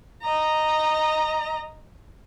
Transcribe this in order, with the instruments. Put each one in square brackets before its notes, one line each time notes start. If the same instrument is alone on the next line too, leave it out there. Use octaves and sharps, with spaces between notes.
[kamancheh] D#5 A#5